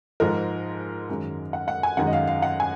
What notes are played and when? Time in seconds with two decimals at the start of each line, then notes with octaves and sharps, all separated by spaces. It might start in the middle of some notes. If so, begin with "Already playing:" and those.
0.20 G#2 F3 G#3 A#4
1.09 F#2 D#3 G#3
1.53 F#5
1.68 F#5
1.83 G#5
1.97 F#2 D#3 G#3 F#5
2.07 D#5
2.13 F5
2.28 F5
2.42 F#5
2.60 G#5